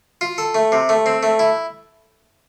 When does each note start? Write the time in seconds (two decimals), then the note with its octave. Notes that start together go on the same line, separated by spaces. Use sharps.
0.21 F4
0.38 A4
0.55 A3
0.72 C3
0.89 A3
1.06 C4
1.23 A3
1.39 E4